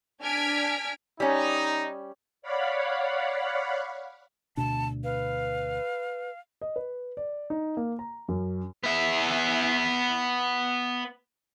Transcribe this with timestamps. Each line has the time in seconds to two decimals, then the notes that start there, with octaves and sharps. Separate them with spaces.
0.22 D4 G#5 F6 G#6 B6 D7
1.20 G3 C#4 D#4
2.42 C#5 D5 F5 F#5 B5
4.57 D2 B2 D4 A5
5.04 B4 F5
6.61 D#5
6.76 B4
7.17 D5
7.50 D#4
7.77 A#3
7.99 A#5
8.28 F#2
8.84 B3 E5